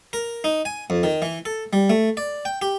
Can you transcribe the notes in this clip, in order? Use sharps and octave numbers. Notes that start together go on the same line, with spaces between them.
A#4
D#4
G#5
F2
D#3
E3
A4
G3
A3
D5
G5
G4